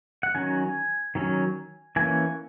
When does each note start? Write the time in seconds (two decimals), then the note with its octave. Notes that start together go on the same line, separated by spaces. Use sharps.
0.23 F#5
0.35 D#3 F#3 C#4 G#5
1.15 D#3 F#3 C#4
1.96 E3 A#3 C#4 G#5